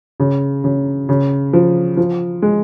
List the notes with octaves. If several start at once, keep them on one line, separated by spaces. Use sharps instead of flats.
C#3
C#3
C#3
F3
F3
G#3